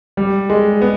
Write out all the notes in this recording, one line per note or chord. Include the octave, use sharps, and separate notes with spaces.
G3
G#3
B3